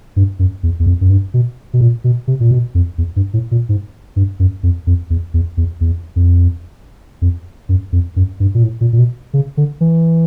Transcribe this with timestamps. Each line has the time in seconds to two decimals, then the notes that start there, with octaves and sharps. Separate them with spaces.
0.16 G2
0.39 F#2
0.63 E2
0.80 E2
0.86 F2
1.01 F#2
1.10 G2
1.34 B2
1.74 B2
1.81 A#2
2.04 B2
2.27 C3
2.40 A#2
2.51 B2
2.75 F2
2.98 E2
3.16 G2
3.34 A2
3.51 A#2
3.69 G#2
4.16 G2
4.40 F#2
4.63 F2
4.87 F2
5.10 E2
5.34 E2
5.57 E2
5.81 E2
6.16 F2
7.22 F2
7.69 F#2
7.92 F2
8.16 F#2
8.40 G2
8.55 A#2
8.63 A2
8.81 A#2
8.93 A#2
8.99 B2
9.34 C#3
9.57 D3
9.81 E3